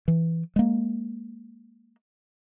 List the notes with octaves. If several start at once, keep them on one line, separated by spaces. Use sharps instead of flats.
E3
G#3 A#3